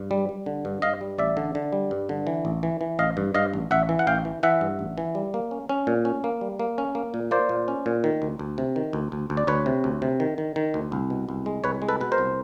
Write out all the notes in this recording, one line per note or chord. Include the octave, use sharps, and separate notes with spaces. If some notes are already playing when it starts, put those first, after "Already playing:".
Already playing: G2
G3
G3
D3
G2
G2 D#5 F5
G3
A1 D5 E5
D3
D3
G3
G2
D3
E3
A1
E3
E3
A1 D#5 F5
G2
G2 D#5 F5
A1
A1 E5 F#5
E3
F#5
A1 F5 G5
E3
E3 E5 F#5
G2
A1
E3
G3
A#3
C#4
C#4
A#2
C#4
A#3
G3
A#3
C#4
A#3
A#2
A#3 C5 D5
A#2
C#4
A#2
D#3
D2
D2
C3
D#3
D2
D2
D2
D5
D2 B4 C#5
C3
D2
C3
D#3
D#3
D#3
D2
C2
B2
C2
G#3
C2 B4 C#5
G#3
A4 B4
B2 B4
A#4 C5
C2